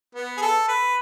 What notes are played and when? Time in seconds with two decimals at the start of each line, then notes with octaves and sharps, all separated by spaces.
0.15 B3
0.37 G#4
0.42 A4
0.68 B4